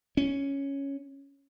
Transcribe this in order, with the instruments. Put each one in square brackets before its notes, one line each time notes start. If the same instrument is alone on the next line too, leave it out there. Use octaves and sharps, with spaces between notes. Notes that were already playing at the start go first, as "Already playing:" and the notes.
[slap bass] C#4